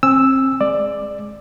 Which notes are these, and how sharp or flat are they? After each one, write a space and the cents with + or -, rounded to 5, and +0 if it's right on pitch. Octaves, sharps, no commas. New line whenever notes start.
C4 +30 G#5 +0 E6 +0
G#3 +10 D5 +15